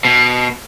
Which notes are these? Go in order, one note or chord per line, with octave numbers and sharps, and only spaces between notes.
B2